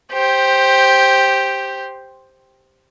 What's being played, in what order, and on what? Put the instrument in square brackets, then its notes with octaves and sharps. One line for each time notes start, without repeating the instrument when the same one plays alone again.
[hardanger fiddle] G4 C5